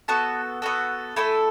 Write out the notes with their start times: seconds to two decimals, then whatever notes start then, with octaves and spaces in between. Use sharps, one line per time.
0.08 B3 F#4 A4 A5
0.62 B3 F#4 A4
1.16 A3 E4 A4 G#5